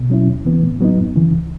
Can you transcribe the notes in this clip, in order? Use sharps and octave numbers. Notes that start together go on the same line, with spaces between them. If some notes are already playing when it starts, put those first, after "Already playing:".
Already playing: B2
F#3 C#4 E4
D#2
C#3 E3 B3
A2
F#3 B3 D#4
F#2
C#3 E3
C#2